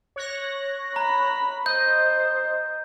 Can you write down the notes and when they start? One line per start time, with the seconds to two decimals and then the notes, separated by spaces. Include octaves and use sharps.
0.16 C#5 F#6 A#6
0.96 A#5 B5
1.66 C5 D#5 G6